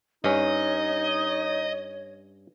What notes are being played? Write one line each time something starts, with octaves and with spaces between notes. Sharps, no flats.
G2 C#4 D#4 C#5 D#5